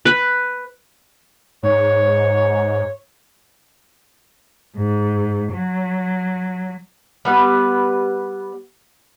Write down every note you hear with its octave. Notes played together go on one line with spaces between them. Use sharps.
B4
G#2 C#5
G#2
F#3
G3 B3 B4